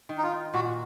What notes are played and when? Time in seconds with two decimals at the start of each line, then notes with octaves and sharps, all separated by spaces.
0.09 D#3
0.18 D#4
0.23 F4
0.54 A#2 F#4